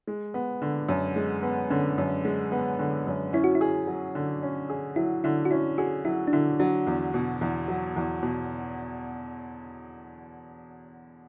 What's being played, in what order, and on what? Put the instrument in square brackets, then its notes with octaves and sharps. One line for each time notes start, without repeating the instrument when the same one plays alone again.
[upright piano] G#3
B3
D3
F#2
G#3
B3
[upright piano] D3 [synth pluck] C#4
[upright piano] F#2
G#3
B3
D3
F#2
[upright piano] C#4 [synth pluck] E4
[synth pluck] F#4
E4
[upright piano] G#4
F#3
D3
C#4
G#4
[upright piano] F#3 [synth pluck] E4
[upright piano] D3 [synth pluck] E4
[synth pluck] F#4
[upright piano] C#4 [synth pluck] E4
[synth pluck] F#4 [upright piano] G#4
[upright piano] F#3 [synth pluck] E4
[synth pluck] D4
[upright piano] D3 [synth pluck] E4
[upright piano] F#3 [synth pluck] D4
[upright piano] E2
B2
E2
F#3
E2
B2